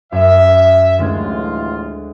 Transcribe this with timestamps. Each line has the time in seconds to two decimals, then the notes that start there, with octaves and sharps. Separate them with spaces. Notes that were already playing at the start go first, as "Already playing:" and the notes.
0.12 F#2 E5
0.98 A1 D2 G#3 F4 G#6